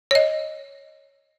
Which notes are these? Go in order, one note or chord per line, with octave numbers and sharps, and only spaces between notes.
C#5 D#5